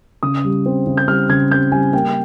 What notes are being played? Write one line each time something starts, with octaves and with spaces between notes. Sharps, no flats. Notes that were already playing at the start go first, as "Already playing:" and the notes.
C#3 D#6
G3
C4
C#3
G6
G3 F6
C#3 G#6
C4 G6
G3 G#5
A#3 G5